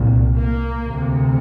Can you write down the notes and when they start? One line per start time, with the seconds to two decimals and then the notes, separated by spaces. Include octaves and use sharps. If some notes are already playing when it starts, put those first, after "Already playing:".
Already playing: C2 A#2
0.38 A#3
0.82 D2 C3